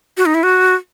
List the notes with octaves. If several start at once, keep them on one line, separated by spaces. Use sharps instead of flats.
F#4
D#4
E4
F#4